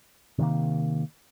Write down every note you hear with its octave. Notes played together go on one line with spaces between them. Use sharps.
C3 D#3 A#3